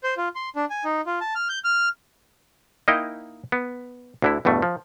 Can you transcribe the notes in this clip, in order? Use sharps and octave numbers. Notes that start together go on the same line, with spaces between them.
C5
F4
C6
D4
G#5
D#4
F4
A5
F6
G6
F6
A#3 D#4 E4 D#5 G5
B3
D2 D3 E4
E2 G2 B2 A3
F3